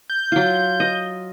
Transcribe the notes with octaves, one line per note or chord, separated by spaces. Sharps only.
G6
F#3 F4
D#5